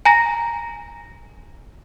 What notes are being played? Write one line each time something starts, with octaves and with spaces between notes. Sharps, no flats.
G#5 A#5 A#6